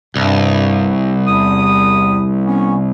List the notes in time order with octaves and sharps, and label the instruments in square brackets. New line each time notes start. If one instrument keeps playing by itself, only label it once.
[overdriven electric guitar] C2 [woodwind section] G2
[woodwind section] E2 B5 D#6
B3 C#4